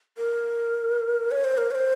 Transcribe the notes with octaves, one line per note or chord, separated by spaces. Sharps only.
A#4
C#5
C5
A#4
C#5
C5